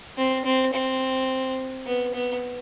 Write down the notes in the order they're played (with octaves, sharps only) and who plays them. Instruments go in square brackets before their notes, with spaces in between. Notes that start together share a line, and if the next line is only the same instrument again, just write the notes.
[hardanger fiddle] C4
C4
C4
B3
B3